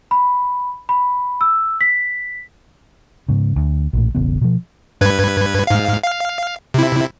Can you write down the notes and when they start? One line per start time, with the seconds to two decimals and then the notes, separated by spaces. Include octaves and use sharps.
0.11 B5
0.89 B5
1.41 E6
1.81 B6
3.29 G#2 C#3
3.56 D2
3.93 A#1 A2
4.15 E1 A1 C#3 B3
4.41 B2 F3
5.01 G2 B4 G#6
5.67 G#2 F5
6.03 F5
6.74 C3 E4